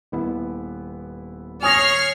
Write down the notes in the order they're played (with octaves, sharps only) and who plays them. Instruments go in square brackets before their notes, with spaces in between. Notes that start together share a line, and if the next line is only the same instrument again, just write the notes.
[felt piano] D#1 B3 E4
[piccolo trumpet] C#5 [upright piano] G#5 D#6 A#6 [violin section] F6 C7